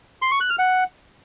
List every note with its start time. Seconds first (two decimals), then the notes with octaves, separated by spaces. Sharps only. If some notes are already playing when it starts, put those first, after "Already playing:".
0.22 C6
0.31 C#6
0.40 F#6
0.50 F6
0.59 F#5